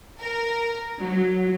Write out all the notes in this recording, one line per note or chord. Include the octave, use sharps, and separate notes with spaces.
A#4
F#3